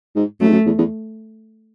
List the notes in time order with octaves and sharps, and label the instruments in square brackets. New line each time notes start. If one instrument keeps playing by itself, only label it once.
[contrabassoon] G#2
[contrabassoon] F#2 [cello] A3
[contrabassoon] G#2
F#2
E2
E2